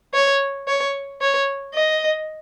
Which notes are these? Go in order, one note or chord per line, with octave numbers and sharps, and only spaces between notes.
C#5
C#5
C#5
D#5